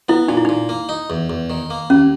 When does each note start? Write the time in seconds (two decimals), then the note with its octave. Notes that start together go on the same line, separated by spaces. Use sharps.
0.09 B3 E4
0.28 A#2 D#4
0.37 E4
0.45 A#2 D#4
0.69 A#3
0.89 D#4
1.10 E2
1.30 E2
1.50 D#3
1.70 A#3
1.90 D#2 C#4